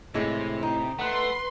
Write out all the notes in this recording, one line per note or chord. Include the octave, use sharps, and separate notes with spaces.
A2 C3 E3 G#3
D#4
A3 B4 F#5 C6 F#6